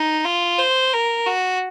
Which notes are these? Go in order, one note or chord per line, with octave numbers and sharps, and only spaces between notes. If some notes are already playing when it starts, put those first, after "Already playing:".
Already playing: D#4
F4
C5
A#4
F#4